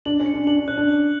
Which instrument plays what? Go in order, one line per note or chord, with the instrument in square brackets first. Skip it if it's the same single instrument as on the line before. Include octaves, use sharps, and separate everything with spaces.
[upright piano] D4 [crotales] F#7
[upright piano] C#4
[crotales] C#7
[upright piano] D4
[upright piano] D4 [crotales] F#7
[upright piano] D4
[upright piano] C#4 [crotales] F#6
[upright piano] D4
[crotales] F#7